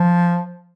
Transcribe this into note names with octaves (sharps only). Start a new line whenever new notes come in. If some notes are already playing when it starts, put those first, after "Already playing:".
Already playing: F3